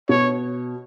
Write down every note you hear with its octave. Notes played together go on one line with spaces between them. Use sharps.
B2 C#5